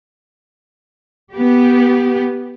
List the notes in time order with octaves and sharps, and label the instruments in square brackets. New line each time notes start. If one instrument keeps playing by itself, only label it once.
[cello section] B3 G4